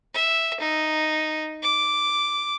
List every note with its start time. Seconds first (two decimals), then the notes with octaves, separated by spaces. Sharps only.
0.14 E5
0.60 D#4
1.62 D6